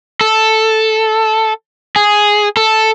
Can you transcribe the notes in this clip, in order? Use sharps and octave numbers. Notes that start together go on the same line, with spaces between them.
A4
G#4
A4